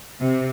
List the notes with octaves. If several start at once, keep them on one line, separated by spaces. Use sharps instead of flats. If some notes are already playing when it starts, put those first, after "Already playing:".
C3